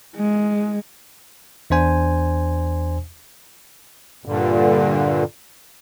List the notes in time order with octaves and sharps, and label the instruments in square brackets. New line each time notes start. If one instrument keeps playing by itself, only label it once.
[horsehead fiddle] G#3
[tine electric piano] E2 D4 C5 G#5
[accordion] G2 A#2 D3